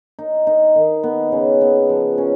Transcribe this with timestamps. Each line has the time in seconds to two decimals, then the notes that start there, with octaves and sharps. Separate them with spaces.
0.19 D#4
0.47 D#4
0.75 D#3
1.03 B3
1.32 C#3
1.61 B3
1.89 F3
2.18 C#4